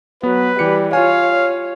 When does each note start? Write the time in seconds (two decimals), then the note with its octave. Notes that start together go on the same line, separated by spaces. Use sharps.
0.23 F#3 B3 B4
0.59 E3 G3 G4 C#7
0.93 F4 C#5 F5 G#5
1.34 C#5